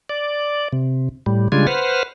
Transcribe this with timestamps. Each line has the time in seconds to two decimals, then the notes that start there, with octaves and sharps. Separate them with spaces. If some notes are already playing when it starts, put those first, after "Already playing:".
0.09 D5
0.72 C3
1.26 A2 G3
1.52 C#3 G3 G#3 D4 F4 G#5
1.67 B4 C5 F#5 F6